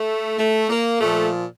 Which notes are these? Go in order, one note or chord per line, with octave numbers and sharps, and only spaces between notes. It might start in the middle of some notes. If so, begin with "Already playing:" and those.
Already playing: A3
A3
A#3
A#2 F3 A3